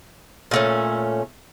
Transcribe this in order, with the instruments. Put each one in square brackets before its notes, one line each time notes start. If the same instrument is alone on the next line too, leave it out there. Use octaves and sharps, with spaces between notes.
[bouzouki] A#2 A3 C#4